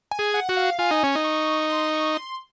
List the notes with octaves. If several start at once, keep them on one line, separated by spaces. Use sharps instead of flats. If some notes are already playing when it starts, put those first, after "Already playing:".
G#5
G#4
F#5
F#4
F5
F4 G#5
D#4
C#4
D#4
C#6
C6
C#6
C6